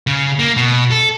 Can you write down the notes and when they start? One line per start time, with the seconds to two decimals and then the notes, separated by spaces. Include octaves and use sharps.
0.07 C#3
0.39 A#3
0.57 B2
0.91 A4